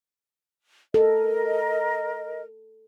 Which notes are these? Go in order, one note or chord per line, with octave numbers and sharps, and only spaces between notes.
A4 A#4 D#5